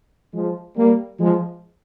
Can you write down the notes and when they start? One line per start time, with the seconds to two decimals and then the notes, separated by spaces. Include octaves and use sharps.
0.34 F3 G#3
0.76 G3 A#3
1.20 F3 G#3